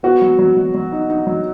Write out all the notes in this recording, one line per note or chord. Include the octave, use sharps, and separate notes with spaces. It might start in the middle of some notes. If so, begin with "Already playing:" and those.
B3 F#4
F#3
F#3
F#3
F#3
D#4
D#4
F#3